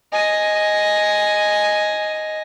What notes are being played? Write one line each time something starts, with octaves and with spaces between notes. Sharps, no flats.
D#5 G#5